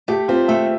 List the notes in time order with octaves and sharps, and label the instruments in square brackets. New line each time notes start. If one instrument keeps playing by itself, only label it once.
[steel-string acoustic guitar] A3 [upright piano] G4
[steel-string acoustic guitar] C4 [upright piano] F4
[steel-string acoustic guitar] A3 [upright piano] E5